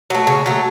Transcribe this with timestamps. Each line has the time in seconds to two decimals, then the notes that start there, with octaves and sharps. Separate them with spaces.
0.10 F#3 A3
0.27 C#3
0.46 F#3 A3